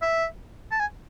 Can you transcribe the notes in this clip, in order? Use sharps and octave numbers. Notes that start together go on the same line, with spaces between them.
E5
A5
G#5